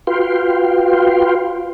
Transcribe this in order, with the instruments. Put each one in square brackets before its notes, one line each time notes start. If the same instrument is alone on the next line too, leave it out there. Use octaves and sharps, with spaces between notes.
[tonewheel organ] F4 F#4 B4 F5 G5 C6